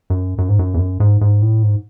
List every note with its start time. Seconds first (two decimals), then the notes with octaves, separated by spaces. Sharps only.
0.10 F#2
0.38 F#2
0.49 G#2
0.59 F#2
0.74 E2
0.79 F#2
1.00 G#2
1.21 G#2
1.42 A2
1.63 G#2